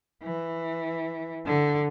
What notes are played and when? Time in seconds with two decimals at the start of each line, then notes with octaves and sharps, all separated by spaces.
0.23 E3
1.46 D3